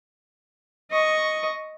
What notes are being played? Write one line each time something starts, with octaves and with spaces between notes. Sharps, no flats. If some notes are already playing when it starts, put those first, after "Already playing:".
D#5 C#6